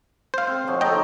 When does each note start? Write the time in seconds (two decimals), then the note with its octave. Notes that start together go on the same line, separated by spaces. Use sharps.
0.34 C5 F5
0.47 C4
0.67 B2 F3 C#5
0.81 D#3 D#4 A4 D#5 G5